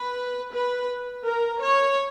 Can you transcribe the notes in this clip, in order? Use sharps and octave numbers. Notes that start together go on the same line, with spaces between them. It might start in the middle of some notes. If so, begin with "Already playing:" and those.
Already playing: B4
B4
A#4
C#5